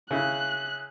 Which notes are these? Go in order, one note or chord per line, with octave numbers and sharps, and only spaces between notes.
C#3 E4 F#6